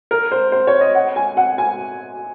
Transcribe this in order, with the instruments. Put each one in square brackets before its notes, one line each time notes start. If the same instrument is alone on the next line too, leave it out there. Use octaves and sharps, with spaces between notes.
[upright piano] A#4
C5
C5
C#5
D#5
F#5
G#5
F#5
G#5